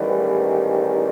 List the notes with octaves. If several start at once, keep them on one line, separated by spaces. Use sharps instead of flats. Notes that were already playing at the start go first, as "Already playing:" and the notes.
Already playing: A1 G#2 D#3 G3 B4
C5